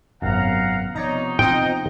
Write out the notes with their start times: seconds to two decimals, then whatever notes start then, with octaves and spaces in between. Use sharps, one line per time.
0.22 G#1 F#2 C3 B3 F5 F#5 A#5
0.96 C3 F3 B3 D#4 C#5 D5 A#5
1.39 C4 F4 D#5 G5